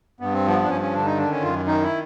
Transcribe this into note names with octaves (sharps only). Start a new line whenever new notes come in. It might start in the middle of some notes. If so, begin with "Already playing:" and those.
G2 B3
C4
F3 B3
D4
G2 C#4
C#4
D3 D4
D#4
D#3 D4
C#4
F#2 F4
D#3 D#4
E4